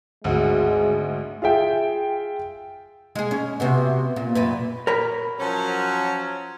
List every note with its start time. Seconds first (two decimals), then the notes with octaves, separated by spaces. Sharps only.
0.24 G#1 D2 G#3 F#4
1.42 F4 G#4 E5 G5
3.15 G#3 G#4
3.31 C#4
3.60 C3 B3 F#4
4.16 A#2
4.35 F#2 A#2 B4
4.87 A#4 C#5 B5
5.39 F3 F#3 C#4